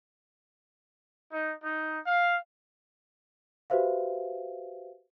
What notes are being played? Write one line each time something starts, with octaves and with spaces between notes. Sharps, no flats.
D#4
D#4
F5
F#4 G4 B4 C5 E5 F5